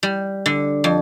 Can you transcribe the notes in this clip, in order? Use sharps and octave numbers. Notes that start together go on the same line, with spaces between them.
G3
D3
F2